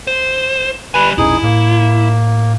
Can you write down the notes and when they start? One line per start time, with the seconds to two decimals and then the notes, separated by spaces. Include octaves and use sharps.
0.07 C5
0.94 G3 B4 G#5
1.18 E1 A#1 C#4 D#4 E4 G#4
1.43 A2 A#3